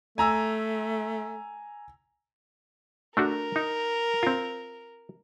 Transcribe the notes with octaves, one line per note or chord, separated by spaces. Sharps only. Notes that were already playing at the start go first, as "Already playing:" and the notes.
A3 G#5 A#5 E6
A3 D4 F#4 A#4
D#4
C4 F4